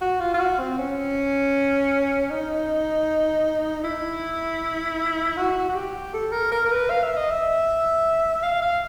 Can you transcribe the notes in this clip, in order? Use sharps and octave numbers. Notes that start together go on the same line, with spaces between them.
F#4
F4
F4
F#4
C4
C#4
D#4
E4
F#4
F#4
G4
A4
A#4
A#4
A#4
B4
F5
E5
D#5
E5
F5
F5